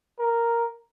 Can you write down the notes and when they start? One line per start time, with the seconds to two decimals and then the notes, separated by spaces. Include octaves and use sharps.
0.19 A#4